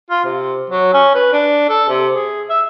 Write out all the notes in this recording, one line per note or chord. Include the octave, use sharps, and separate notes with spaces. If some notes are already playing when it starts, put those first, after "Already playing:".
F4
C3
F#3
C#4
B4
D4
A4
C3
G#4
E5